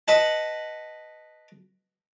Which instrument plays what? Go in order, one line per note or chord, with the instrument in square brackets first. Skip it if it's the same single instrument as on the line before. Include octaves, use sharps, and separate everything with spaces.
[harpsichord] B4 D#5 F#5 A5